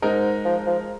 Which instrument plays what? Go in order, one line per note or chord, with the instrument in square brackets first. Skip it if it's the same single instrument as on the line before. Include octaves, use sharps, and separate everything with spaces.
[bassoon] G#2 [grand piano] G#3 D#4 A#4
[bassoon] F3
F3